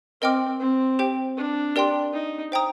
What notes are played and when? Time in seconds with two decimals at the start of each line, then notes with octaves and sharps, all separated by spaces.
0.21 C4 A#4 D#5 G5 D6 F6
0.60 C4
0.99 G4 C5 G5
1.37 D4
1.76 G4 A#4 D5 G5 C6
2.13 D#4
2.52 C5 G5 A#5 D#6